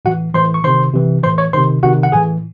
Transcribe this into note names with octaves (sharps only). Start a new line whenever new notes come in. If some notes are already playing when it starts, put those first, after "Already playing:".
A2 E3 F#4 F#5
A2 E3 C5 C6
C#6
C3 D#3 C5 C6
C3 E3
A2 E3 C5 C6
C#5 C#6
C3 D#3 C5 C6
C3 D#3 F#4 F#5
F#5
A2 E3 G#4 G#5